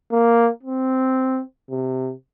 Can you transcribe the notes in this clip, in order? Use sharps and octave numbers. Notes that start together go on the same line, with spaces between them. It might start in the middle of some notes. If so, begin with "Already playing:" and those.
A#3
C4
C3